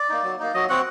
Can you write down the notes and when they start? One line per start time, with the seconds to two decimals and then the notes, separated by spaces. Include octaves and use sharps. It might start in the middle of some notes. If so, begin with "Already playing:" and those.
Already playing: D5
0.10 A#3 D#4
0.24 F#3
0.40 A#3 D#4
0.54 F#3 D#5
0.69 C4 F#4 F#5